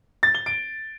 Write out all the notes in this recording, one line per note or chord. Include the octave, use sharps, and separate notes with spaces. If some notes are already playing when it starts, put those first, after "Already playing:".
A6
G7
D7